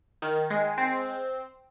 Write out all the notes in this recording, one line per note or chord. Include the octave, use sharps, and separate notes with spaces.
D#3
G#3
C4